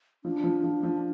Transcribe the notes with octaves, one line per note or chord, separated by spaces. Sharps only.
F3 D4
F3
F3
F3